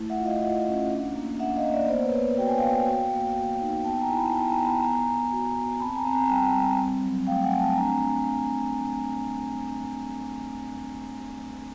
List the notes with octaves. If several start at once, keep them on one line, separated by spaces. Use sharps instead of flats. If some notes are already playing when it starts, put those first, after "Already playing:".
Already playing: A3 E4
E5 F#5
F4
D#5 F5
F4 E5 F#5
C#4
D4
A#3
D4 E5 F#5
D#5 F5
A#3
D5 E5
B3 C5 D5
B4 C#5
B3
F#4 G5
G#5
B3 F5 G5
F#4
A#3
F#4
D#4
B3 G5 A5
G#5 A#5
E4
A5 B5
B3 G5 A5
G#5 A#5
B3
A5 B5
B3 G#5 A#5
B3
F#4
B3
C4 A5 B5
G#5 A#5
C4
G#5 A#5
G3 G5 A5
G3
C4
F#3
A3 F5 G5
F#5 G#5
C4
G5 A5
D4 G#5 A#5